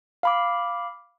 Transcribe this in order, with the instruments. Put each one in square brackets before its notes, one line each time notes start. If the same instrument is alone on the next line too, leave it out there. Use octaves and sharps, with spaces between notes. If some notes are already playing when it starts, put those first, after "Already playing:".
[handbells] F5 B5 D6